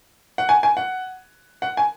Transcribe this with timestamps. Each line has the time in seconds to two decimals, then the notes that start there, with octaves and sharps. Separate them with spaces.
0.38 F#5
0.49 G#5
0.63 G#5
0.77 F#5
1.62 F#5
1.77 G#5